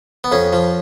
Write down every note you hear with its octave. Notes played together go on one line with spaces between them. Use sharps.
B3
F2 C#4
F3